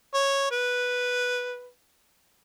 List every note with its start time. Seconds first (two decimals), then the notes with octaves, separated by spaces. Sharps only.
0.14 C#5
0.51 B4